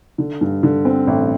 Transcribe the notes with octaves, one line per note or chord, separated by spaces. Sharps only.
D3
G2
D3
C4
A1